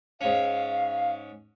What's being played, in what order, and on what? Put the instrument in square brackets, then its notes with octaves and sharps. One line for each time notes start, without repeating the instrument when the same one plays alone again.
[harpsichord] G#2 C#4 [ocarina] F5